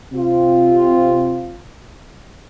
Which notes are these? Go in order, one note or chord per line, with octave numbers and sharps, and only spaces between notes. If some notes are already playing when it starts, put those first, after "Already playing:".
C3 C4 F4